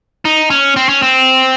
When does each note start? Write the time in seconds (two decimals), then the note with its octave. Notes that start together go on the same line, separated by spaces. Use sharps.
0.25 D#4
0.50 C#4
0.76 C4
0.89 C#4
1.02 C4